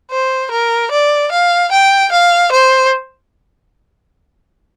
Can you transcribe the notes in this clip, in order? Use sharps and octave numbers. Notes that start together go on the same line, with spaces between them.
C5
A#4
D5
F5
G5
F5
C5